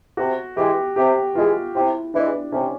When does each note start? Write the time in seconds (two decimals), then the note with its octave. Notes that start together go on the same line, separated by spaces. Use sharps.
0.17 C3 F#4
0.57 E3 G#3 G4
0.96 C3 G4
1.35 E3 G#3 F4
1.74 C3 E4
2.14 E3 G#3 D4
2.52 C3 C#4